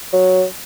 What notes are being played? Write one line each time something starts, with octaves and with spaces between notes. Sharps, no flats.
F#3